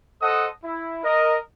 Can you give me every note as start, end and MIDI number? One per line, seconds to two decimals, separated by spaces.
0.22 0.46 69
0.22 0.46 72
0.22 0.46 75
0.22 0.46 78
0.22 0.46 87
0.63 0.99 64
1.03 1.37 70
1.03 1.37 75